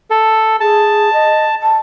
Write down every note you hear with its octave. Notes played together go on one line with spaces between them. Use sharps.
A4
G#4 A5
D#5
A5